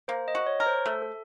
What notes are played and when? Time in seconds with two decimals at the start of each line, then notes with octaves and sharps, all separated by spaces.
0.08 A#3 C5
0.28 D#5
0.35 F#4
0.47 C#5
0.60 A#4
0.66 C5
0.86 A3 A4
1.02 A4